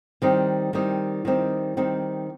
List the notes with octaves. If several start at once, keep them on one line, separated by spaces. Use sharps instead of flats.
D#3 G3 C4 D#4
D#3 G3 C4 D#4
D#3 G3 C4 D#4
D#3 G3 C4 D#4